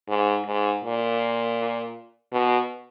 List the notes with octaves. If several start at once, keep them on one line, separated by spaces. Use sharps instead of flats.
G#2
G#2
A#2
B2